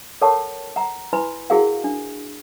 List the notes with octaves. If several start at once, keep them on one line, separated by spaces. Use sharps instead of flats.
A4 A#4 C#5 F#5 A5 C#6
F#5 A#5
E4 B4 G#5 B5 C6
E4 F#4 G#4 A#4 F5 F#5
D4